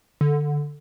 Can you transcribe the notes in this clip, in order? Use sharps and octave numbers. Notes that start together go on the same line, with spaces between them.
D3